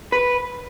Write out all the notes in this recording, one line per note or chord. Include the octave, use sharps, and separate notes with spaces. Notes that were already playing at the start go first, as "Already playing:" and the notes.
B4